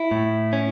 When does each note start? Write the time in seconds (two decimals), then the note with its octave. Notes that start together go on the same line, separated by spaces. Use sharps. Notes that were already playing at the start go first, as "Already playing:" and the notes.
Already playing: E4
0.11 A2
0.53 C#4